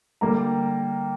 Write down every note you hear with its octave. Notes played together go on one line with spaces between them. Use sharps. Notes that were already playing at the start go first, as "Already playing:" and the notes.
D3 G3 A#3 A#5